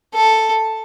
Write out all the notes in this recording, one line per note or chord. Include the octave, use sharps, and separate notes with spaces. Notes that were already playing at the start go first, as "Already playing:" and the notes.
A4